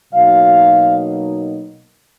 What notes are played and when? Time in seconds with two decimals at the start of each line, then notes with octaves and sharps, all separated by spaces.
0.13 B2 F#3 A#3 D#4 F5